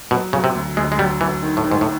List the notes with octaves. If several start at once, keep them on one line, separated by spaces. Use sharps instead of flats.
B2 F#3
C#3 F#3
C3
D2
D2 G#3
G#3
F#3 G3
E3 F#3
D#3
A2
D#3
G#2
A2